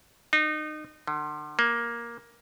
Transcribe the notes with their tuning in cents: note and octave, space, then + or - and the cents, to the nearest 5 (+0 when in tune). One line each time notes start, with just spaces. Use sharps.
D#4 -30
D3 +40
A#3 +10